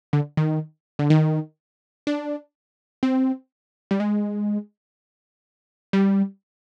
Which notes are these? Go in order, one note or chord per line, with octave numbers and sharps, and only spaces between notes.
D3
D#3
D3
D#3
D4
C4
G3
G#3
G3